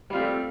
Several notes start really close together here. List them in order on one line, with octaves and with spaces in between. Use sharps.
G3 F4 C4 A3